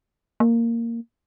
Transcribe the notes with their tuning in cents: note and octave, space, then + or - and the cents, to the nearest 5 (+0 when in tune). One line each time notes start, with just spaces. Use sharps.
A#3 -10